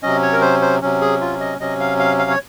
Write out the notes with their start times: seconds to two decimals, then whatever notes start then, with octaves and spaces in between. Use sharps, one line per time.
0.03 C3 F#3 C#4 D#5
0.22 C#5
0.32 A#4
0.41 C5
0.62 C5
0.81 C3 F#3 C#4
1.01 G#4
1.21 F4
1.40 D#5
1.60 C3 F#3 C#4 D#5
1.80 F5
1.99 F5
2.19 F5
2.30 C#5